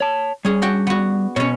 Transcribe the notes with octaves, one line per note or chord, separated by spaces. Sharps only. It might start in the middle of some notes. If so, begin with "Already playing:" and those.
C#5 A5
G3 C#4 G#4
D4 F#4 G5
B3 F#4
B2 C#4 C#5